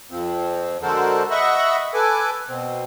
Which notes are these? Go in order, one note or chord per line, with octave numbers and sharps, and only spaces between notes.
F2 F3 C4
D3 G#3 F#4 A4 A#4 C5
D#5 E5 F#5 B5 C#6
A4 B4 G#5 D6
B2 C4